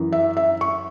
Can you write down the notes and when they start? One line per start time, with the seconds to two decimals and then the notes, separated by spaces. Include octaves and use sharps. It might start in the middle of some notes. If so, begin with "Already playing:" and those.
Already playing: F#2 E3
0.12 E5
0.37 E5
0.61 C#6